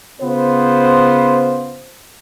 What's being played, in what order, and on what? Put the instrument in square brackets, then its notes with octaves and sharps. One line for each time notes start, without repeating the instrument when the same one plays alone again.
[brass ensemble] C#3 B3 F4 C5